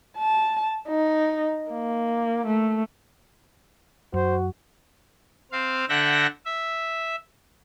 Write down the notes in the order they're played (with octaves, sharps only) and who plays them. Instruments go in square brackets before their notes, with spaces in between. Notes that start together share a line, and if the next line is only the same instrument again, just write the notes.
[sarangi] A5
D#4
A#3
A3
[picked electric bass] F#2 [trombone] F#4 [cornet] C5
[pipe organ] C4 F5
D3 E5 F#5 G5 A#6
E5